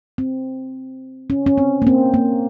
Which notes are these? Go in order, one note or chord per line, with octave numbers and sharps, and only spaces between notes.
C4
C#4
C#4
C4
A#3
C4
A#3